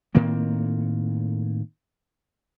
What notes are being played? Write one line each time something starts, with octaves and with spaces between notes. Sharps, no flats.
A2 D#3 A#3 C4